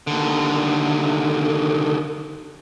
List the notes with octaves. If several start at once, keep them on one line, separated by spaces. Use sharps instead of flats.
D#2 D3